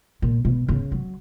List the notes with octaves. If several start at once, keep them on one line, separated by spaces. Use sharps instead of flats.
A#2
B2
C#3
F#3